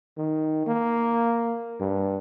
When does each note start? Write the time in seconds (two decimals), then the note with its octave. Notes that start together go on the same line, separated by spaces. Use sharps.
0.18 D#3
0.66 A#3
1.80 G2